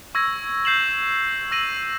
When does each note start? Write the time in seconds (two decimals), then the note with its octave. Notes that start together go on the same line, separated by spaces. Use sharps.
0.15 C#6 E6 G#6 A#6
0.65 G6 C7 E7 F#7
1.51 E6 A#6 D#7 F#7